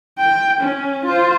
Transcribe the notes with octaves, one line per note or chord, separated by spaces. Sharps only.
G5
C#4
F4 C5